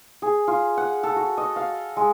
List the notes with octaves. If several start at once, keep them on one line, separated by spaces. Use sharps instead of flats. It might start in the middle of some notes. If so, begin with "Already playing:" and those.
G#4
F4
F#5
A4
F#4
D#5
F5
G#3